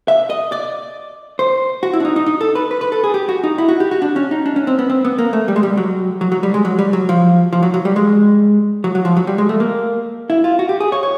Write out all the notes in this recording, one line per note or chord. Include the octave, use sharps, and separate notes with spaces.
E5
D#5
D5
C5
F#4
E4
D4
D#4
D#4
D#4
A4
B4
B4
B4
A4
G#4
G4
F#4
D#4
E4
F#4
G4
F#4
D4
C#4
D#4
D4
C#4
C4
B3
C4
B3
A#3
A3
G3
G#3
G3
F#3
F#3
F#3
G3
G#3
F#3
G3
F#3
F3
F3
F#3
F#3
G3
G#3
F#3
F#3
F3
F#3
G3
G#3
A3
A#3
E4
F4
F#4
G4
G#4
C#5
C#5